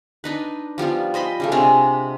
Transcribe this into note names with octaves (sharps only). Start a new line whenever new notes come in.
D4 D#4 B4
F3 G3 B3 F4
C5 D#5 B5 C6
C#3 G3 A3
C3 G#3 D4 F5